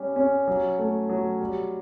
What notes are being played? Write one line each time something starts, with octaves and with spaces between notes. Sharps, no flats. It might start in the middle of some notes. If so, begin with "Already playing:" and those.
Already playing: G3 C#4
C#4
F#3
A3
F#3
G3